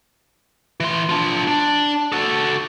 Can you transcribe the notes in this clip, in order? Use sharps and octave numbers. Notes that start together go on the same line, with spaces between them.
E3 C6
D4 F4
D4
F#4 A4